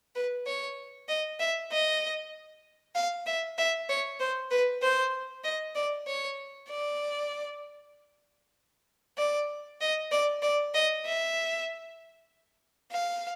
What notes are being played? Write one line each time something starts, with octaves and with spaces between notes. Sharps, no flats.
B4
C#5
D#5
E5
D#5
F5
E5
E5
C#5
C5
B4
C5
D#5
D5
C#5
D5
D5
D#5
D5
D5
D#5
E5
F5